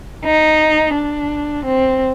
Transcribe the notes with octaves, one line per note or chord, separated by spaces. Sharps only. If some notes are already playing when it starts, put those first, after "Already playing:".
D#4
D4
C4